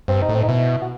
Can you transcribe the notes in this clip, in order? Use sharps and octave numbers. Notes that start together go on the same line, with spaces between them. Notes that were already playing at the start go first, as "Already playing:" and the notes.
G2 C4
D#4
A2
C4
D#4
B2 E4
F#4